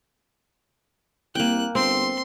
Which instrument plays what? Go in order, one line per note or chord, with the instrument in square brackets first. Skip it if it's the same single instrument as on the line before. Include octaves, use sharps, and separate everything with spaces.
[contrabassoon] C2 [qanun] A#3 G5 [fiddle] F#6
[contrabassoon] G1 [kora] C4 [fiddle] C6